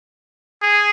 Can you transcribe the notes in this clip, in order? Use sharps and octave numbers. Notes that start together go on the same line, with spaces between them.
G#4